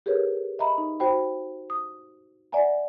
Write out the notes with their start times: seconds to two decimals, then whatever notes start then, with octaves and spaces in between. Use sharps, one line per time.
0.06 G4 G#4 A#4 B4 C#5
0.59 D#5 E5 A#5 B5
0.78 D#4
1.00 F#4 C5 G5 B5
1.70 D#6
2.52 D5 E5 F#5 G#5 A#5